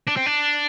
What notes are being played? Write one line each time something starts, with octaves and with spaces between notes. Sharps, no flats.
D4
C4
D4